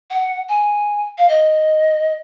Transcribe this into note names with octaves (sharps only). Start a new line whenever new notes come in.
F#5
G#5
F5
D#5